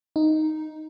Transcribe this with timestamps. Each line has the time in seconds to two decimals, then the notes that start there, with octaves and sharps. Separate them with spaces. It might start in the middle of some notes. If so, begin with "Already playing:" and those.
0.16 D#4